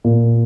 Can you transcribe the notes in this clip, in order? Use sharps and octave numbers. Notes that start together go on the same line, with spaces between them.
A#2